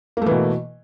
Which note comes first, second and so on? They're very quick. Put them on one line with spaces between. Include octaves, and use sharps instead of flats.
A#3 A3 E3 B2